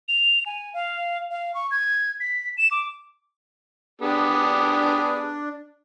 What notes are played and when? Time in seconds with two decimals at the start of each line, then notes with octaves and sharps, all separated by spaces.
0.08 F7
0.46 G#5
0.74 F5
1.30 F5
1.54 C#6
1.71 G#6
2.20 B6
2.57 E7
2.71 D6
4.02 B3 D4 G4 G#4